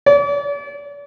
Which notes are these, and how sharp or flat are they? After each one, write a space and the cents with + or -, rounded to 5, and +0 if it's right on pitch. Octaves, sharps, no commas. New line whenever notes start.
D5 -40